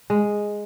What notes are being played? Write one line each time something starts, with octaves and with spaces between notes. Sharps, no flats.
G#3